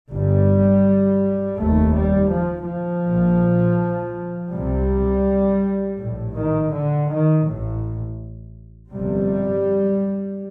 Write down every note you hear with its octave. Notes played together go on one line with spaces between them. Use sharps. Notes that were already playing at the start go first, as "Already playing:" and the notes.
G1 G2 G3
F1 D#2 A3
G3
F3
F3
A#1 A#2
C2 C3 G3
A#1 A2
D#3
D3
D#3
A1 A2
G1 F2 C3 G3